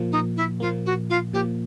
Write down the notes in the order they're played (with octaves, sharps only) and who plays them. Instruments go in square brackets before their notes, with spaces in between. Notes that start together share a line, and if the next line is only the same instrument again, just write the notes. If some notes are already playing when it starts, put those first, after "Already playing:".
Already playing: [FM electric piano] A#2 F3 A#3
[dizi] D#4
E4
[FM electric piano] A#2 F3 A#3 [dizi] F4
[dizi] F#4
F4
[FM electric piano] A#2 F3 A#3 [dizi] G4